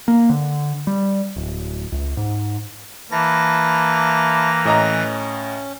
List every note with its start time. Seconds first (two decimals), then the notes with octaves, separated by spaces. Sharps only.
0.08 A#3
0.30 D3
0.87 G3
1.36 D1
1.92 C#2
2.17 G#2
3.12 E3 A#3 E4 A5 A#6
4.65 A2 C#4 D#5 A#5